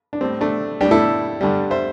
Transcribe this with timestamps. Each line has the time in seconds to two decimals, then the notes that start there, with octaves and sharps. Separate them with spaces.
0.13 D4
0.21 A2 G3 C4
0.41 A3 D4
0.81 G3 D4 G4
0.85 A2
0.91 E4 A4
1.41 G2 D3 G3
1.71 C5 E5